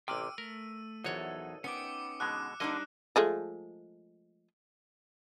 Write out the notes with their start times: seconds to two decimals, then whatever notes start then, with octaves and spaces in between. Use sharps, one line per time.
0.08 A1 C3 G5 D6 E6 F6 D#7
0.38 A3 A#4
1.04 A#1 E2 F#3 D#4 A4 C#5
1.64 B3 C#4 D#4 G5 D6 C#7
2.20 B2 D3 G#3 F#6
2.60 D3 G3 A#3 D4 D#4 D#5
3.16 F3 G#3 A3